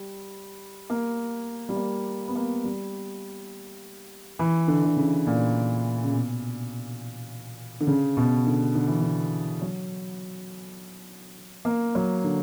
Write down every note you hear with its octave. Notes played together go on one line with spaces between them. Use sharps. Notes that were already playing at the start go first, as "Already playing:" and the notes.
Already playing: G3
A#3
G3
A#3
B3
A#3
G3
E3
D3
D3
C#3
A#2
C#3
B2
D3
C#3
B2
D3
D3
E3
D3
F#3
A#3
F#3
D3